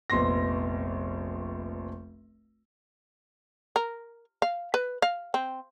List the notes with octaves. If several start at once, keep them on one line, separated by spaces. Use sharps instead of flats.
F1 A#1 B3 C6 A#6
A#4
F5
B4
F5
C4